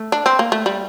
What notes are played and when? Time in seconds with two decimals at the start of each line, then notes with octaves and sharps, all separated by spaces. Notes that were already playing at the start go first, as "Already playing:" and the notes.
Already playing: A3
0.12 D4
0.26 C4
0.39 A#3
0.52 A3
0.66 G3